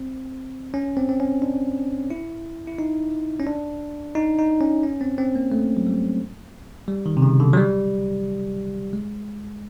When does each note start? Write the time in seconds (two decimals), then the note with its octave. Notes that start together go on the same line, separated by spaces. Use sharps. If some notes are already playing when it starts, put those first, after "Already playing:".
Already playing: C4
0.74 C#4
0.97 C4
1.09 C4
1.20 C#4
1.42 D4
2.10 E4
2.68 E4
2.79 D#4
3.39 C#4
3.47 D4
4.15 D#4
4.39 D#4
4.61 C#4
4.83 C#4
5.01 C4
5.18 C4
5.36 A#3
5.52 A3
5.77 F#3
5.87 G3
6.88 G3
7.06 D#3
7.17 C3
7.22 C#3
7.40 D3
7.53 F#3
7.57 G3
8.93 G#3